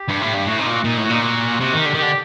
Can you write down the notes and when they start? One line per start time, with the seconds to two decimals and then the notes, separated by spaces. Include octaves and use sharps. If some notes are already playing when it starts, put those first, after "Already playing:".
Already playing: G4
0.09 G2
0.22 A2
0.34 G2
0.46 A2 F#4
0.59 C3 D#4
0.66 A#2
0.72 F#4
0.84 A#2 D#4
0.97 A2
1.04 F#4
1.10 A#2 D#4
1.22 F#4
1.60 C3 F#4
1.73 D#3
1.79 G4
1.86 D3
1.94 D#3
1.98 D3 G4